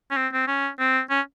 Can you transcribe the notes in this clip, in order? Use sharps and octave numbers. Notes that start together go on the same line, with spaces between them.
C#4
C4
C4
C#4
C4
C#4